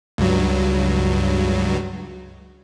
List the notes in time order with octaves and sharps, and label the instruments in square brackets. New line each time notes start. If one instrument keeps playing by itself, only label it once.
[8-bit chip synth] C#2 G2 F#3